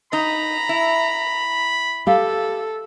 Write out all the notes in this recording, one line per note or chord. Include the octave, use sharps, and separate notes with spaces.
D#4 A#5 B5
E4
G4 A4 F5